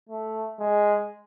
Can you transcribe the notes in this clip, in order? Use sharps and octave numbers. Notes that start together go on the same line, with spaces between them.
A3
G#3